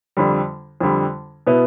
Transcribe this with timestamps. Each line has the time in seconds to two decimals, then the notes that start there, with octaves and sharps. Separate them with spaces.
0.17 F2 D3 G3
0.80 F2 D3 G3
1.47 B2 B3 E4